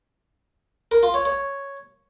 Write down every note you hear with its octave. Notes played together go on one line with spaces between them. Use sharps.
A#4
F4
C#5
C#5